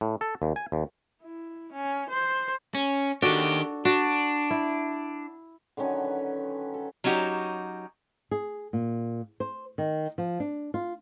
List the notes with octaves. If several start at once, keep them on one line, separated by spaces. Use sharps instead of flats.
A2
A4
D#2
G#5
D#2
E4
C#4
C5
C#4
D#3 D4 F#4 G4 A4
D4 F#4
E4
D3 D#3 F#3 C#4
B4
A4
F#3 C#4 D#4 F#4 G4
G#4
A#2
C5
D#3
F3
D4
F4